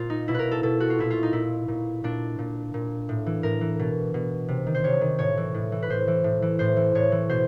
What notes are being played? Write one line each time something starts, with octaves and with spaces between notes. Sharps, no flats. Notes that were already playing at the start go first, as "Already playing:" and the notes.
Already playing: A#2 C4 F4
D#4
B2 E4
A#4 B4
A4
B2 A4
F#4
F4
A#2 E4
F4
D#4
A#2 E4
A#2
A#2 D4
A#2
A#2
A2
E3
A2 A#4
E3
B2
B2
C3
D#3
C5
C3 C#5
D#3
A2 C#5
E3
A2
E3
B4
A2 C5
E3
A2
E3
A2 C5
E3
A2 C#5
E3
B2 C5